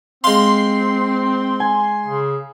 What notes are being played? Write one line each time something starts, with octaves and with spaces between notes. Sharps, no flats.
G#3 C4 F5 C6
G#5
C#3